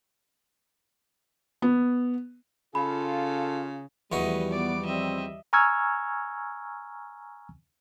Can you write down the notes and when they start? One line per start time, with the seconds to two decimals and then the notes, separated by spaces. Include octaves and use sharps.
1.62 B3
2.75 C#3 F4 A4 B5
4.12 E2 E3 F3 G3 A3 F#4 B4 D#5
4.50 B3 D5 D6
4.85 C4 D#5 E5
5.53 G#5 A#5 C#6 E6 F6 G#6